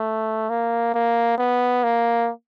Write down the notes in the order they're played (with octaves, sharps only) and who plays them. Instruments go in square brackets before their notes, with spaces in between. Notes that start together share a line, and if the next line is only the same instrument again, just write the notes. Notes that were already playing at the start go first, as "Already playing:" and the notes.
Already playing: [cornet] A3
A#3
A#3
B3
A#3